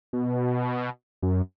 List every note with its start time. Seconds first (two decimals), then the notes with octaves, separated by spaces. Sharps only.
0.13 B2
1.22 F#2